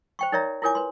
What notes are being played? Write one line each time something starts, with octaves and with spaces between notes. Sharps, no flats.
C5 G5 C#6
D#4 A#4 C#5 D5 E5 A#5
E4 F4 A#4 C#5 G#5 D6
B4 C6